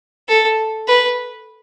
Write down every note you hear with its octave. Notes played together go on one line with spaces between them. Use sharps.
A4
B4